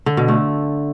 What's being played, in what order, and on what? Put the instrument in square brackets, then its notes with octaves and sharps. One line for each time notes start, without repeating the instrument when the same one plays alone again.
[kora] D3
B2
A3